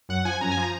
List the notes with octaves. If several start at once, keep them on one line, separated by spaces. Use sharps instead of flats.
F#2 F#5
F3 G#5
F#2 A#5
G#5
F3
A#5